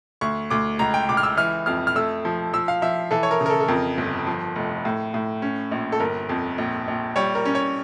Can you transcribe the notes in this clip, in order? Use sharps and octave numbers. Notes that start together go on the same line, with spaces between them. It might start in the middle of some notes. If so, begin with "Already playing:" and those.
D2 C#6
D2 D6
C#2 A#5
G5
C#2 D6
F6
E6
E3 F6
F2 F6
F6
A3 E6
F3
F3 E6
F5
F3 E5
E3 A4
C#5
A#4
C#3
A#4
A4
A4
F2 A#4
G1
F3
F1
A2
A2
C#4
A#1
A4
G1 A#4
F2
A#1
A#1
G3 C#5
A#4
C#4
C#5